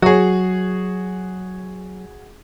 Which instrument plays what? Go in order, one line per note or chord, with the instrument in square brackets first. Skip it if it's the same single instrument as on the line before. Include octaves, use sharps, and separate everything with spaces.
[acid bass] F#3 [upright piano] F#4 G#4